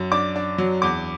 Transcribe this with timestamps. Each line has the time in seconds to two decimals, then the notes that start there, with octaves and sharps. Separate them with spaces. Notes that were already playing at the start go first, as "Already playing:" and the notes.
Already playing: F#2
0.12 D4 D6
0.36 D4
0.58 F#3
0.82 E2 D6